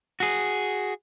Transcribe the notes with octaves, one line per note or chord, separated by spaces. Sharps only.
F#4 G#4